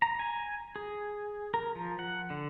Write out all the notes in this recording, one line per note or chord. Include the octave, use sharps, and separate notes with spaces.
A#5
G#5
G#4
A#4
F3
F#5
D3